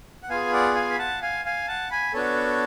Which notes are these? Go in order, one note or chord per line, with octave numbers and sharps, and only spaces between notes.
F#5
B3 F4 G#4 F5 G#5
D5 F#5
F5 G#5
B5
F#5 A5
F5 G#5
F5 G#5
F#5 A5
G#5 B5
B3 D4 F#4 A4 C#5